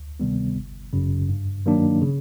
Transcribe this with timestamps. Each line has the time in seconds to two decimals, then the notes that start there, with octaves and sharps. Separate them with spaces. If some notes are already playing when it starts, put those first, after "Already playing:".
Already playing: D2
0.20 C3 D#3 G3 B3
0.55 G1
0.93 F#2 C#3
1.29 G2
1.66 D#3 F#3 A#3 D4
2.02 C#3